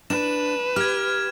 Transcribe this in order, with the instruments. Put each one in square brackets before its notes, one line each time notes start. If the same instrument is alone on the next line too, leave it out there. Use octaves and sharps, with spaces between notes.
[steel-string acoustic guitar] D4 [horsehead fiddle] B4 [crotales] E7
[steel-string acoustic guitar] G4 [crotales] F6 G#6